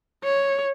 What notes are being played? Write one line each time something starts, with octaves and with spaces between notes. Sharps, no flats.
C#5